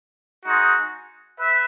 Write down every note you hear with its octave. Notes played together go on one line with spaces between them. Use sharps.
G#3 D#4 F#4
B4 E5